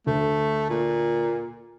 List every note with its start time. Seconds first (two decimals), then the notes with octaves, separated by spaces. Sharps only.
0.07 D2 A3
0.70 A#2